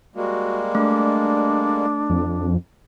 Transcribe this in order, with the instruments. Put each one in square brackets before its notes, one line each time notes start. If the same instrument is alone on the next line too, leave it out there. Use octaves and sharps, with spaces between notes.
[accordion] G3 G#3 A#3 [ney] F#4
[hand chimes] A3 [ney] D4
[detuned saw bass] F2